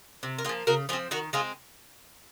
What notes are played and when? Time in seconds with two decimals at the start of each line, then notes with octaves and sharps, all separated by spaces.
0.23 C3
0.38 A#4
0.45 A#3 F4 G#4
0.49 F3
0.67 C#3 F#4 A#4
0.89 F3 F4 G#4
0.93 C4
1.11 D#3 F#4 A#4
1.33 G#3 C4 F4 G#4